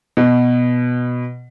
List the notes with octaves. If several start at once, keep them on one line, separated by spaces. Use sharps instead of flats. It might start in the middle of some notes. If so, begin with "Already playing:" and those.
B2